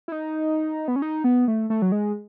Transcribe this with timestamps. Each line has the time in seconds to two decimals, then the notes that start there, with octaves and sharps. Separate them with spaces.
0.08 E4
0.12 D#4
0.88 B3
0.96 C#4
1.02 D#4
1.24 B3
1.48 A3
1.70 A3
1.82 F#3
1.92 G#3